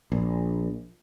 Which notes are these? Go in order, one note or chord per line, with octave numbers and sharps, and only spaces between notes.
A#1